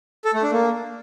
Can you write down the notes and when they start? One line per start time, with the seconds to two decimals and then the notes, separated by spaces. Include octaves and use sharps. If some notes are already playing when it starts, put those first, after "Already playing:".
0.25 A4
0.34 A3
0.43 D4
0.52 A#3